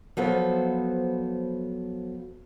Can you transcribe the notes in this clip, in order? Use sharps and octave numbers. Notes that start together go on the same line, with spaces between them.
F3 F#3 B3 A4 C5